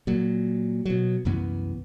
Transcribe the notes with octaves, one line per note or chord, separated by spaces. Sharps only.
A#2 F#3
B2 F#3
C2 F#2 E3 B3